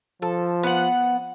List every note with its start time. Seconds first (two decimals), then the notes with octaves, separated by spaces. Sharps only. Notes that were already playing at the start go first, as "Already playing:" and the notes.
0.22 F3 A4
0.63 B3 F#5